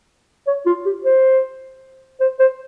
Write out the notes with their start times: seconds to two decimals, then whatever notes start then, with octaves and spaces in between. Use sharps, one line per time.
0.47 C#5
0.66 F4
0.86 G4
1.04 C5
2.20 C5
2.39 C5